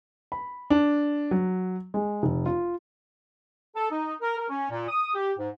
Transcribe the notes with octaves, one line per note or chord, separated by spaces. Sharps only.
B5
D4
F#3
G#3
F1
F4
A4
D#4
A#4
A#4
C#4
A#2
D#6
G4
G#2